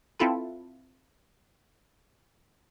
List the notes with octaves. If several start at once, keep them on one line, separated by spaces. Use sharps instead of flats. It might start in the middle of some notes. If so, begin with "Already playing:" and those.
C4 E4 F4 A4 B4